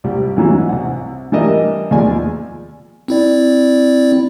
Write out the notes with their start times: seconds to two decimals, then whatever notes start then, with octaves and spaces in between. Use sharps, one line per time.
0.04 C2 G3
0.36 G#2 E3 F#3 B3
0.69 C2 F#5
1.32 E3 G3 D4 A#4 D#5 E5
1.91 D#2 F3 G#3 B3 D5 G#5
3.08 C4 E4 D5